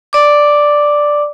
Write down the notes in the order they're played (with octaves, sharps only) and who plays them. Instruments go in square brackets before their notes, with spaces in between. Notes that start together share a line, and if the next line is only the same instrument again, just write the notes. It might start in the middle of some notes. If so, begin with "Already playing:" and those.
[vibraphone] D5 D6